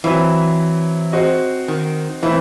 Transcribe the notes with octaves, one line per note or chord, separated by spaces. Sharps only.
E3 F#3 C4 E4
C4 F#4 C5 D#5
D#3
E3 A3 C4 E4